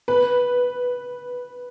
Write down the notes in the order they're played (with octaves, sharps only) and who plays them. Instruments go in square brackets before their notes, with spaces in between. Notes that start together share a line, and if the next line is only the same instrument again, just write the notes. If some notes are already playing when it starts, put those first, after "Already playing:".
[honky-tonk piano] B4